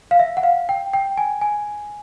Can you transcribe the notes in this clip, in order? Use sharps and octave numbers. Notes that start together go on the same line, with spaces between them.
F5
E5
F#5
F5
G5
G5
G#5
G#5